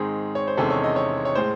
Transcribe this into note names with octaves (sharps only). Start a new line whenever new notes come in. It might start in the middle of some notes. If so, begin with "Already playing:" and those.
Already playing: G#2 D#3 G#3 C4 G#4
C#5
C5
E2 C3 D#3 G#3 C#4 A4
C#5
D#5
C#5
C#5
A2 G#3 C5